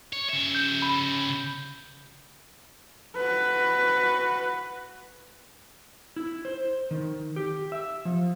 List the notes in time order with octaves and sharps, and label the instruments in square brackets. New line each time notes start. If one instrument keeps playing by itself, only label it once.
[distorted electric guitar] C#5
C#3 E5
[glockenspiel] G6
B5
[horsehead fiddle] F#4 B4
[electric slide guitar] E4
C5
D#3
G4
E5
F3